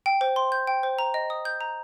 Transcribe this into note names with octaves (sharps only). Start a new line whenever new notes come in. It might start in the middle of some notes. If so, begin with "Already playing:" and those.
G5
C5
C6
G6
G5
C5
A#5
D#5
D#6
G6
A#5